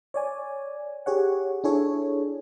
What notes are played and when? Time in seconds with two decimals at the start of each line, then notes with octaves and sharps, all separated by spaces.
0.14 C#5 D5 G#5
1.06 G4 G#4 C#5 F#5
1.64 D4 E4 G#4 A4 C#5